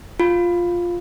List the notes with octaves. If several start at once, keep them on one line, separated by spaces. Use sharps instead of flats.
F4